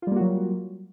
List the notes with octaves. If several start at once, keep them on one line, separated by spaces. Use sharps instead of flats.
F#3 G3 A#3 F4 F#4